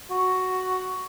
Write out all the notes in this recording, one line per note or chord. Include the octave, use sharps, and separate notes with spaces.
F#4